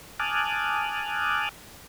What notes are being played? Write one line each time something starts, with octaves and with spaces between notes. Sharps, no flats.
G#5 A5 D6 D#6 F6 F#6